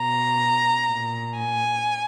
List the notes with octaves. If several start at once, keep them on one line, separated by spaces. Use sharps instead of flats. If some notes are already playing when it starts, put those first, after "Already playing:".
Already playing: B2 A#5
A#2
G#5